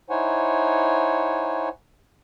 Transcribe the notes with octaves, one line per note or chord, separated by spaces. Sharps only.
D#4 E4 C5 C#5 F#5 G#5